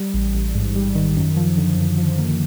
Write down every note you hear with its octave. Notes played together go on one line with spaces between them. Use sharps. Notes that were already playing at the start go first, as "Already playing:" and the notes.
Already playing: G3
A1
A1
G#2
G3
D#3
F#2
F3
D3
F#2
F3
A#3